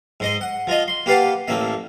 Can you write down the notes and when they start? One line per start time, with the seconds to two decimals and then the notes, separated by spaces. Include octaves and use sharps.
0.20 G#2 C5 D#5
0.41 F#5
0.67 F3 F4 D#5
0.88 C6
1.06 A#3 G4 B4 F5 F#5 A5
1.48 A1 A3 A#3 E5